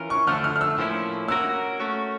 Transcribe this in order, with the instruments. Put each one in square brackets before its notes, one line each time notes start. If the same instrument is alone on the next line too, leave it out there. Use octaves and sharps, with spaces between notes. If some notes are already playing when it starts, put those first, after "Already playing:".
Already playing: [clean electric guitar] E3 C#4 F4 A#4
[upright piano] C#6
[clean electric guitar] D3 F3 A3 D4 [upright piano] F6
[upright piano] F6
F6
E6
[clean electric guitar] A2 F3 A#3 C#4 E4
[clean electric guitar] A#3 C#4 F#4 A#4 [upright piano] E6
[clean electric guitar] A3 C#4 F#4